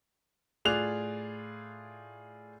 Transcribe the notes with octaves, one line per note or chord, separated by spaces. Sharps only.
A2 F4 G#4 D5 F#6 F7